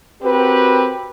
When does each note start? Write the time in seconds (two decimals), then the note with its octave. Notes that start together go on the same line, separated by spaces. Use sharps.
0.22 C4 F#4 G4 A#4 B4